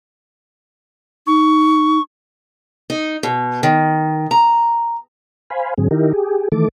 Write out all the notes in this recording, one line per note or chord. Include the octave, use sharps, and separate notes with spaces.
D#4 C#6
D#4
B2
D#3
A#5
C5 F5 G#5 B5
G#2 D3 F#3 C4 G#4
D#3 D#4 E4 G4 A#4
G4 G#4
D#3 E3 A3 A4 D6